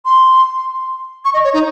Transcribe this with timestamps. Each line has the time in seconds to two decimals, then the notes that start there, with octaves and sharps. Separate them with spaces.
0.05 C6
1.25 C#6
1.34 D#5
1.44 C#5
1.54 D#4